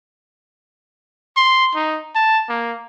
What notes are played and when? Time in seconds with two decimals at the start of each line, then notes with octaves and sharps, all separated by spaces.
1.37 C6
1.75 D#4
2.15 A5
2.49 A#3